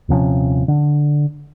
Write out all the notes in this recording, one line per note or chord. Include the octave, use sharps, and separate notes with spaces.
D#1 C3 F3 C#4
D3